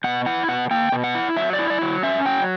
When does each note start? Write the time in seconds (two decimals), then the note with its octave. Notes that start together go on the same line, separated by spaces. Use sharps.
0.04 B2 F#5
0.26 E4 F#5
0.48 B2 F#5
0.71 A#3 G5
0.92 B2
1.04 F#5
1.15 E4
1.36 F#3 E5
1.53 D5
1.59 E4
1.70 D5
1.81 F#3
2.03 C#4 E5
2.25 F#3 G5